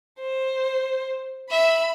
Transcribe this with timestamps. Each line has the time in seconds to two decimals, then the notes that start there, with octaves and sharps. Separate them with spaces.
0.20 C5
1.50 E5 B5